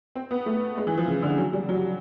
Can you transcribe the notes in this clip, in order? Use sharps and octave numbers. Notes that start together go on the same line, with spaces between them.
C4
B3
A3
G#3
E3
F3
C#3
D3
F#3
G3
F#3